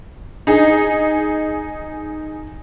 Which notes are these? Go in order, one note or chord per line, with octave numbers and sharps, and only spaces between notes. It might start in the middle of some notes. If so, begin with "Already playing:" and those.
D#4 G#4